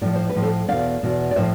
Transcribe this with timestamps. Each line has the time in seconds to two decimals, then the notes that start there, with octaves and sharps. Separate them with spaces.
0.01 A2 F3 D5
0.16 C5
0.29 B4
0.36 A2 F3
0.42 A4 C5
0.68 E2 B2 D5 F5
1.03 E2 B2
1.31 D5
1.36 A2 F3 C5 E5